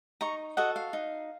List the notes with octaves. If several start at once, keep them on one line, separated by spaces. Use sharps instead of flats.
D#4 A#5 C#6
F#4 A4 D#5 F#5
F5
D#4